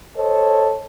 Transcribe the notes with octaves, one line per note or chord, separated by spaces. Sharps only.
A4 C5 C#5 D#5 A5